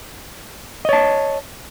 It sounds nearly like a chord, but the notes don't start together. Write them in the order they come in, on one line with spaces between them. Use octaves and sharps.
D#5 C#5 A5